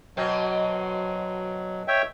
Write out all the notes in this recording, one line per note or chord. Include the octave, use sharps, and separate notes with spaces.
B2 F#3 C4
C#5 E5 G5